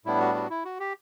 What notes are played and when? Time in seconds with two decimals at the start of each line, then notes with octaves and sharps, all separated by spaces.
0.05 A2 G3 B3 D4 E4
0.20 F#4
0.35 F#4
0.50 E4
0.65 F#4
0.80 G4